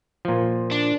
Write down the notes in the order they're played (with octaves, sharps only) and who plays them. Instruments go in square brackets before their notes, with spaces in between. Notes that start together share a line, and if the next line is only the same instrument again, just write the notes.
[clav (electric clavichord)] A#2 F3
[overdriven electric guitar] D4